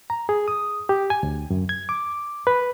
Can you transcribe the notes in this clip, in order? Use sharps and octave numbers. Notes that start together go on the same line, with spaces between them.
A#5
G#4
D#6
G4
G#5
D2
F#2
G#6
D6
B4